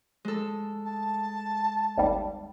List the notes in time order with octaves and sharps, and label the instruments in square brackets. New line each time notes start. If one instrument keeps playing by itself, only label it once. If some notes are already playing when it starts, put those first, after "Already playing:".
[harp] G#3 A4
[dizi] A5
[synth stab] G#1 D#2 G3